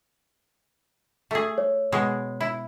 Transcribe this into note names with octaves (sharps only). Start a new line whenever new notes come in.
A3 G#4
C#5
B2 G#3
E4